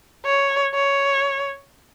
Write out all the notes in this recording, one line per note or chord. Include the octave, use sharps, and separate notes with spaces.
C#5
C#5